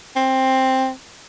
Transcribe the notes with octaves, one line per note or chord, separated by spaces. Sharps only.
C4